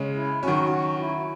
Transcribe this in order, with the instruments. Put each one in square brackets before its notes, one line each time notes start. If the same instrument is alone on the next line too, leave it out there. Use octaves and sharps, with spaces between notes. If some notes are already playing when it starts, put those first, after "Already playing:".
Already playing: [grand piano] C#3 G#3 C#4
[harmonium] E4
[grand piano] D#3 F#3 C#4 [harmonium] F#4
[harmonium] F#4
E4